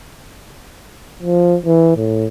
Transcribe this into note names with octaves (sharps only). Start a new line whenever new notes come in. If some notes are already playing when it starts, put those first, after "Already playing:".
F3
E3
A2